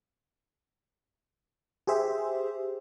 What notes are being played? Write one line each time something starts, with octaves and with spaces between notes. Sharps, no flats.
G4 G#4 C5 E5